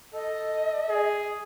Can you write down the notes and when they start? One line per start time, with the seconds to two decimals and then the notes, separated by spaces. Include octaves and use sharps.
0.14 A4 D#5
0.89 G#4